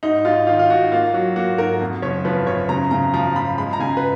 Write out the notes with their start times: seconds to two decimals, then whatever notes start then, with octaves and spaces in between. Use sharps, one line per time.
0.03 G#2 D#4
0.25 G#2 F4
0.47 D#3 F4
0.59 F4
0.69 G#2 F#4
0.92 A#3 F4
1.13 F#3 F#4
1.36 A#3 F#4
1.58 G#2 A#4
1.80 F2
2.02 F#1 C#5
2.25 F3 B4
2.47 F#1 C#5
2.69 C#3 A#5
2.91 C#3 A#5
3.13 F3 A#5
3.36 F3 B5
3.58 G#3 B5
3.73 A#5
3.79 C#3 G#5
3.97 B4